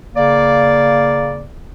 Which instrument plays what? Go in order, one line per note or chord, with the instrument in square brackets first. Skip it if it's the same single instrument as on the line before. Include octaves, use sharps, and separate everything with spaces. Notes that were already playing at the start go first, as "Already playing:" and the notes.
[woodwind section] C#3 A#3 D5